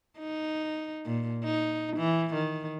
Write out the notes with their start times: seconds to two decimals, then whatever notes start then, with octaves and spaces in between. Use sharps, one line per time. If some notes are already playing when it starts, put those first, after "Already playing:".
0.19 D#4
1.06 A#2
1.44 D#4
1.97 E3
2.35 D#3